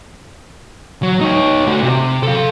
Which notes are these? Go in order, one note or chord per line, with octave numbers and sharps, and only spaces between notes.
F#3
D#4 C#5
A3 F#4
C3
A4 F5